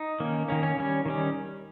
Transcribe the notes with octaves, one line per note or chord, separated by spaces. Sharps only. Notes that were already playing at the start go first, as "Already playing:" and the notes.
Already playing: D#4
D#3 A#3 C#4
D#3 A#3 C#4
C#4
D#3 G3 C#4
D#3 G3 C#4